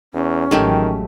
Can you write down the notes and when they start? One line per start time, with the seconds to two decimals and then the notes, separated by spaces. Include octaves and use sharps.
0.13 E2 C#4
0.51 A1 D#3 F#3 G#3 A3 G4